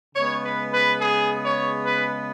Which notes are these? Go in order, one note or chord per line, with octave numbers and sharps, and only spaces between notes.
C#3 G#3 B3 C#5
B4
B4
G#4
C#5
B4